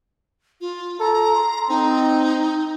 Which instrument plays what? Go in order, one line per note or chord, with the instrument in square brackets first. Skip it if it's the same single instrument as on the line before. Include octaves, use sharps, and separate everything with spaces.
[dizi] F4
[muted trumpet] A4 [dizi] A#5
[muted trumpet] C6
[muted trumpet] C4 [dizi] D#4